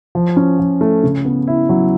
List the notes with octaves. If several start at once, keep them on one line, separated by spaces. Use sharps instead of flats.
F3
C#4
F3
A3
C#3
B3
E4
F#3